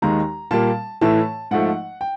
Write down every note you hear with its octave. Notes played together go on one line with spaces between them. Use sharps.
D#2 D#3 G#3 A#5
A#2 G3 A#3 A5
A2 E3 A3 A5
G#2 F3 A3 F#5
G5